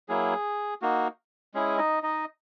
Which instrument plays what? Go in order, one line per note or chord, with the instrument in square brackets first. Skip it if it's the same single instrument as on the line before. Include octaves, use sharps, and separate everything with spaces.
[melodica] F#3 A#3 E4 G#4
A#3 D#4 F#4
G#3 C#4 E4 G#4
D#4 D#5
D#4 D#5